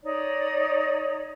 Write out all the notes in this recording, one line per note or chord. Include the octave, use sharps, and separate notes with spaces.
D#4 C#5 D5